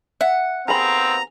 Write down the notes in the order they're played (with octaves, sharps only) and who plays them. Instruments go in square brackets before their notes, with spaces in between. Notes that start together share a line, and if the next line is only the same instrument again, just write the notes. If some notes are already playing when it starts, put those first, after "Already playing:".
[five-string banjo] E5 [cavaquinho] F#5
[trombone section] D#2 B3 C4 [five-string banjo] G#4 B5 [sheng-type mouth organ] A#5